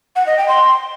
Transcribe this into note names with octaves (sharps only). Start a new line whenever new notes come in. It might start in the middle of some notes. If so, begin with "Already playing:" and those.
F#5
D#5
G5
C6